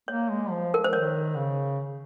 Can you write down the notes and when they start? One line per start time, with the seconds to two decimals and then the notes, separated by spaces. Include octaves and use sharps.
0.08 A#3 C#5
0.30 G#3
0.50 F3
0.74 A#4
0.84 C5
0.93 D#3 C#5
1.36 C#3